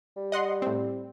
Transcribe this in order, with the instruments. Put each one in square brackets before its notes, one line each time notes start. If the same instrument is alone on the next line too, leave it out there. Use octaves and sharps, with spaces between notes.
[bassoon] G3
[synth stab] D#5 F#5 C6
A2 C4